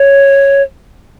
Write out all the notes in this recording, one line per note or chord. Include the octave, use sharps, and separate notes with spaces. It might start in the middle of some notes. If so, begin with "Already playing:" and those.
Already playing: C#5